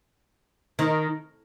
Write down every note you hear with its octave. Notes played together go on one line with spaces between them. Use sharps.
D#3